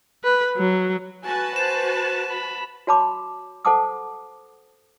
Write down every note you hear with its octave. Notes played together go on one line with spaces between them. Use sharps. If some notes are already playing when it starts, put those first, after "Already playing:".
B4
F#3
F#4 B4 G#5 A5
C5 E7
B5
F#4 C#5 A5 B5 D6
A4 C5 F#5 A5 D6 D#6